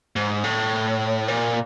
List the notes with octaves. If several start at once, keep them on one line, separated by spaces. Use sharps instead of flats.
G#2
A2
A#2